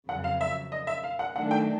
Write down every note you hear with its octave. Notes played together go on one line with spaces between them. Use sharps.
F2 C#3 F#3 F#5
F5
E5
D#5
E5
F5
F#5
D#3 F#3 A3 D4 F#5
G5